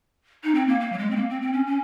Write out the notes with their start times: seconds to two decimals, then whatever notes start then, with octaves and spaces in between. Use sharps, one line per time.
0.44 D#4
0.55 C4
0.68 A#3
0.80 A#3
0.92 F#3
0.98 G#3
1.11 C4
1.16 A#3
1.30 C4
1.42 C4
1.53 C#4
1.67 C#4